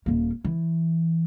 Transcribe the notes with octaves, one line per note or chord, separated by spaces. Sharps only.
D#1 A#3
E3